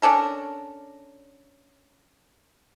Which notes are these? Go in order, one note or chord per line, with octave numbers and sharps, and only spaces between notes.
C#4 D4 A4 A#4